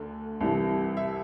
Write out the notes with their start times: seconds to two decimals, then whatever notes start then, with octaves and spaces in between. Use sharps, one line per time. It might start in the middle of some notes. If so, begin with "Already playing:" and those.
Already playing: D2 D3
0.41 C2 C3 E3
0.97 E5